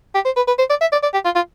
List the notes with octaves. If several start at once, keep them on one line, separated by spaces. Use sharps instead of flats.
G4
C5
B4
B4
C5
D5
E5
D5
D5
G4
F4
F4